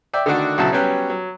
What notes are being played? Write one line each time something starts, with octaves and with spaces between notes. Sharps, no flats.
D5 E5 G5
D3 D#3 A3 D4 F#4
B1 C#3 F#3 E4 F#4 A5
F#3 G3 B3 C#4 G5 F#6
F#3